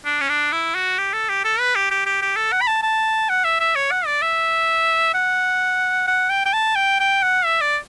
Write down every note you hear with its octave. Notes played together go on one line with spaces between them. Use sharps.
D4
C#4
D4
E4
F#4
G4
A4
G4
A4
B4
G4
G4
G4
G4
A4
F#5
B5
A5
A5
F#5
E5
E5
C#5
F#5
D5
E5
F#5
F#5
G5
G5
A5
G5
G5
F#5
E5
D5